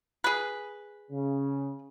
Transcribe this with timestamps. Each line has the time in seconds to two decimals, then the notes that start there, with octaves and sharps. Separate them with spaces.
0.24 G#4 B4
1.11 C#3